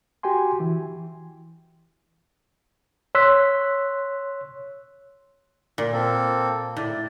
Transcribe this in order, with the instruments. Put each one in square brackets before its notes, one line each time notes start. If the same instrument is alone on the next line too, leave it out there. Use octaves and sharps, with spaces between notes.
[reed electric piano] F#4 G4 G5 G#5 C6
E3
[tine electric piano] C#5 C6 E6 F#6 B6
[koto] A#2
[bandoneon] A#3 C4 A4
[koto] A2 [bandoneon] D5